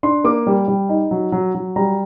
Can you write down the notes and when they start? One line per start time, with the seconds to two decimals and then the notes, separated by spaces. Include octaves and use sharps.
0.03 D4 C6
0.24 A#3 D6
0.47 G3
0.68 G3
0.89 D#4
1.11 F#3
1.32 F#3
1.54 F#3
1.76 G3 A#5